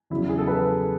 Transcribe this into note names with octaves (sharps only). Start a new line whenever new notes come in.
E2 C#3 F#3 E4
G#4
A4
B4